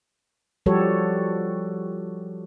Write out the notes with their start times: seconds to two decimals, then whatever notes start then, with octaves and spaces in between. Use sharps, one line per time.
0.66 F3 G3 F#4 G4 A4 C#5